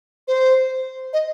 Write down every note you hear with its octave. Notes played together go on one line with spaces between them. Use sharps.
C5
D#5